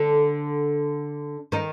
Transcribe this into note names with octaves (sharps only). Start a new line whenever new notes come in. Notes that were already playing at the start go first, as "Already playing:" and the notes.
Already playing: D3 D4
D#3 D#4